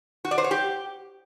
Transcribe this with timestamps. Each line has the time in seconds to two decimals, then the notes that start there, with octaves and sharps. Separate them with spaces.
0.25 F#4
0.31 D5
0.38 C5
0.44 C#5
0.51 G4